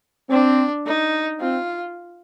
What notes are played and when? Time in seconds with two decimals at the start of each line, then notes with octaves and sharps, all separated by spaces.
0.30 C4 D4
0.86 D#4
1.41 C4 F4